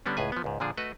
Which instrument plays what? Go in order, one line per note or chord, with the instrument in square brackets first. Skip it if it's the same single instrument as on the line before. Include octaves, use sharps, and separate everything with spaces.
[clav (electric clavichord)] D3 G3 B3 C#4 D4
C#2 A2 G#4 B4 G#5
F3 B3
C#2 G#2
A#2 D3 F3 D4 G#4
A3 F#4 B4 D#5